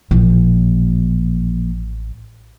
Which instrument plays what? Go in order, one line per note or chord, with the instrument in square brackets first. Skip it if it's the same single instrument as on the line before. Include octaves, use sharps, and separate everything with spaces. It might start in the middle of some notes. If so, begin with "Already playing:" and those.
[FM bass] A1 [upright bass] A#2 F3